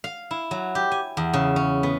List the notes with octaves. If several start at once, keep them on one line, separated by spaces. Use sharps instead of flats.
F5
E4
F#3
G4
G#5
E2
C#3
C#4
B3